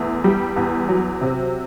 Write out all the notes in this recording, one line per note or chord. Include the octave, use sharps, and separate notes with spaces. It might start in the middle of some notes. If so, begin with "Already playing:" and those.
Already playing: E2 A3
G3
E2
F#3
C3